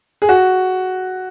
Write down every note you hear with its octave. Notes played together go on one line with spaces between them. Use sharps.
G#4
F#4